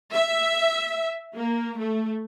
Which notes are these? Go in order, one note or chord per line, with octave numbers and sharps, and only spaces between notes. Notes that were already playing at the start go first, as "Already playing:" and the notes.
E5
A#3
A3